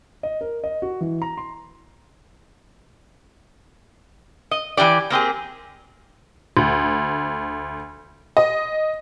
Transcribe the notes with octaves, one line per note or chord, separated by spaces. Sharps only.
D#5
A#4
D#5
F#4
E3
A#5
C6
D#5
E3 F3 G4 D5
A#3 C4 G4 G#4
D2
D#5